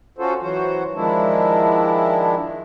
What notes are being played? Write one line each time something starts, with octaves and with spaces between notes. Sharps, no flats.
C#4 F4 F#4 A4 C5
E3 F#3 F#4 C5
D#3 F3 G#3 D4 E4